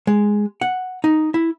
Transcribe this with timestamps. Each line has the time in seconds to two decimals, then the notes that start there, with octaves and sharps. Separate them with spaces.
0.07 G#3
0.61 F#5
1.04 D#4
1.34 E4